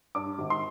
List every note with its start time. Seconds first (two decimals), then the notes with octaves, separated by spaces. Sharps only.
0.15 G2 D6
0.39 G#1
0.50 C6